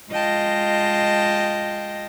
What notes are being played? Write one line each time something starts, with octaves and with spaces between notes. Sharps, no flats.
G#3 F4 D#5 G5 A5 A#6